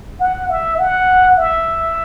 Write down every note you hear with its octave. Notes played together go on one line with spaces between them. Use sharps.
F#5
E5
F#5
E5